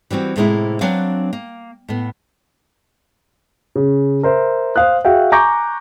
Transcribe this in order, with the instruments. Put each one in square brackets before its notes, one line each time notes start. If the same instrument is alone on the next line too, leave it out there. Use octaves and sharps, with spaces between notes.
[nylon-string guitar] E3 G3 C4 F#4
A2 C3 G#3 A#3 C4 E4
F#3 C4 D4 B4 F5
A#3
A2 B3
[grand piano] C#3
A#4 C5 E5
C5 F5 D#6 F#6
F#4 G#4 E5 F5 G5
G#5 A#5 C#6 D6 G6 A#6